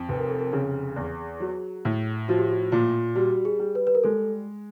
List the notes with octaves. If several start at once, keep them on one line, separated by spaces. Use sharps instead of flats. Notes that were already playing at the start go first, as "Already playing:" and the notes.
Already playing: F2
F1 B4
A#4
A4
A#4
C#3 G#4
E2
F#3
A2
F3 F#4
G4
F#4
A#2 F4
G3 F#4
G#4
G3
B4
B4
A#4
G#3 A4